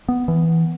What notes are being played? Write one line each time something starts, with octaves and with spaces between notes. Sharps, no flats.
B3
E3